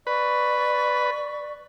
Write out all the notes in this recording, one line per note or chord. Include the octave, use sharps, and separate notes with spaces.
B4 D5 C#6